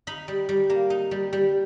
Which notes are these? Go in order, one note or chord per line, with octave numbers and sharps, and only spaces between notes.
D#4 B5
G3
G3
A#3
D#4
G3
G3